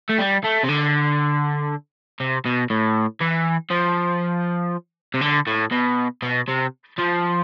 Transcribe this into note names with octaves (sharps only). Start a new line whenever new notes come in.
A3
G3
A3
C3
D3
C3
B2
A2
E3
F3
C3
D3
A2
B2
B2
C3
F3